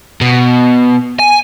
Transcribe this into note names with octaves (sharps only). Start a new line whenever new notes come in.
B2
G#5